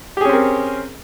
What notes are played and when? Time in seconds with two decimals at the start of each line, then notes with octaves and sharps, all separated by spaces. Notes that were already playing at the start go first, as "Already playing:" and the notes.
0.17 G4
0.21 G#4
0.25 C#4
0.29 C4
0.33 A#4